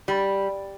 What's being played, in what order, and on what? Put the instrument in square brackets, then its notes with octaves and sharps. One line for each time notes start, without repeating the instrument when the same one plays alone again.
[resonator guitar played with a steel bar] G3